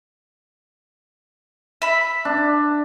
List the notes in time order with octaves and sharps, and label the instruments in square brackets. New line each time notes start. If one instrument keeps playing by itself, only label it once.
[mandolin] E5 B5
[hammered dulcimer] D4